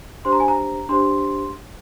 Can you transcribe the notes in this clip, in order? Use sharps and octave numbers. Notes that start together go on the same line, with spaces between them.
D4 G4 C5 C6
A#5
G#5
A#5
D4 G4 C5 C6